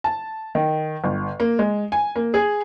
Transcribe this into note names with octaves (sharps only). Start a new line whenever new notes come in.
A5
D#3
G1
A#3
G#3
G#5
A#3
G#4